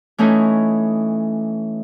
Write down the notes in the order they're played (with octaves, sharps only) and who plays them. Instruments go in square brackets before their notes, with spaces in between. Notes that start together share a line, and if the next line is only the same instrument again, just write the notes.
[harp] E3 A3 C#4 D#4 C#5